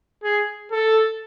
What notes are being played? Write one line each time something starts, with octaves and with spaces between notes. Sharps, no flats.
G#4
A4